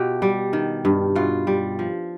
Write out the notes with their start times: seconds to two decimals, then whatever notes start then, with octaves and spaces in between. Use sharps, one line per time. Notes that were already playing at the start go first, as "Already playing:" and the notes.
Already playing: B2 F4 G4
0.22 G3
0.53 D#3
0.85 G2
1.16 B2 F4
1.47 G3
1.79 F3